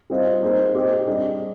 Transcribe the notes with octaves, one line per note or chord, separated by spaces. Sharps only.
G3 C4 F4 C5 D#5
A#3 D#4 G#4 C5
C4 G4 C5 D#5
G3 D4 G#4 D#5